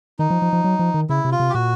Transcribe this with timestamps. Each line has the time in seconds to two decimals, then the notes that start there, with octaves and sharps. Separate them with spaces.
0.19 D#3 D#4
0.30 F3
0.42 F3
0.53 F3
0.64 F#3
0.79 F3
0.94 D#3
1.09 C#3 E4
1.25 C3
1.32 F4
1.40 C3
1.50 G4
1.54 A#2 F#4